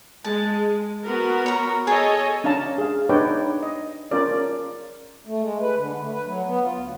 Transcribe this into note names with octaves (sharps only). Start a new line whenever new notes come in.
G#3 A5
B3 F#4 A#4
C#5 A#5
G#4 A4 C#5 D#5
C#4 D4 F5 A5 A#5
G#4 F5
D4 D#4 B4 C#5 D5 G5
D#5
C#4 F4 A#4 D5
A3
G#3
B4
D3
A3
B4
F#3
B3
F4
D2